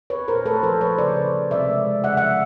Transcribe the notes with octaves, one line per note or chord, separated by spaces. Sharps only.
C4 B4 C#5
A#2 A#4 C5
A3 A4 B4
F3 A#4 C5
F3 B4 C#5
C#3 C5 D5
C#3
G3
C3 D5 E5
G#3
G#3
C#3 E5 F#5
F3 E5 F#5